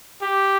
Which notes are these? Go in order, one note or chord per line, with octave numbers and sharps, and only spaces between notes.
G4